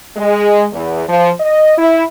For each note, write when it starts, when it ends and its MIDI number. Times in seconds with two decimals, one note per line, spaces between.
0.17 0.67 56
0.72 1.03 40
1.08 1.30 53
1.40 1.74 75
1.78 2.04 64